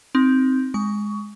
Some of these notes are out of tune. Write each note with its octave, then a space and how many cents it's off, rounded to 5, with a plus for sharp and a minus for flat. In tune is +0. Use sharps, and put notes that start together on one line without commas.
C4 +0 D#4 +10
G#3 +0 C#6 +20